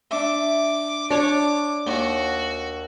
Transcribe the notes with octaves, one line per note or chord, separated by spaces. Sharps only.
D4 E5 D6
D4 C#5 D5 D6
D#2 F#4 D6